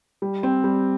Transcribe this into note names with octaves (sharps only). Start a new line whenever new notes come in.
G3
C4
G3